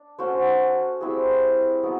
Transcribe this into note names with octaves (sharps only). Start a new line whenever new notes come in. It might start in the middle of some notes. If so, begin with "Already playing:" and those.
Already playing: D4
C#4 F#4 A4 C5
G3 C4 E4 G#4
F#3 B3 D#4